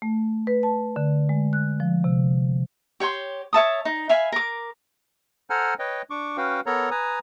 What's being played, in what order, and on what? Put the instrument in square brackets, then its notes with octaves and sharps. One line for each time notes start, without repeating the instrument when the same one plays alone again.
[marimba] A3
B4
A5
D3
G#3
F#6
F3
C3
[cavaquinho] G4 C#5 G5 C6
C#5 E5 A5 D#6
D#4
E5 F5 G#5 B5
A#4 D6
[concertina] A4 C5 F#5 G#5 A#5 F6
B4 C#5 D#5 G5
D4 C#6 D6
C#4 F#4 B4 F5 G5
B3 A4 A#4 C#5 A#5
B4 G#5 A#5 D#6